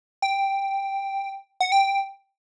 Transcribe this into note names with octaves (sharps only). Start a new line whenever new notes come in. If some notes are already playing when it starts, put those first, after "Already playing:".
G5
F#5
G5